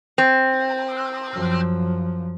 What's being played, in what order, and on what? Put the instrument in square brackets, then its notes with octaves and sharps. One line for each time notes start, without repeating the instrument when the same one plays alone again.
[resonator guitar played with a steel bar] C4
[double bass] F#2 F3